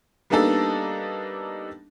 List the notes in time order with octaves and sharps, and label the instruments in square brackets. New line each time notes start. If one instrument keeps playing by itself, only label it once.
[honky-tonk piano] G3 A#3 B3 D4 D#4 A4